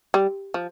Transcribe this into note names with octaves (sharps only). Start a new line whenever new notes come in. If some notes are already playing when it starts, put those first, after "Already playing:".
G3
F3